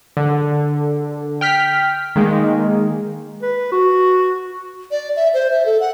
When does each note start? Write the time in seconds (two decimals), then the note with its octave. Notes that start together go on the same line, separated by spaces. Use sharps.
0.17 D3
1.41 G5 F6 B6
2.16 D#3 G#3 A#3
3.42 B4
3.72 F#4
4.91 D5
5.16 E5
5.34 C5
5.51 E5
5.66 A4
5.80 F#5